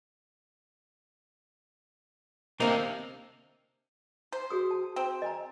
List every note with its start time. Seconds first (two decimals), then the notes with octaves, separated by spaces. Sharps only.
2.60 C3 A#3 D4 D#4 F5
4.32 C5
4.50 F#4 G#4 D#6
4.71 A5
4.96 C4
5.22 D#5 G#5 A#5